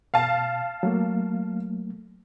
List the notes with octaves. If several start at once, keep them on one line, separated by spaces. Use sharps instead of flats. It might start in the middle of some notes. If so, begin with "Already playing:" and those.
B2 F5 A5
F#3 A3 A#3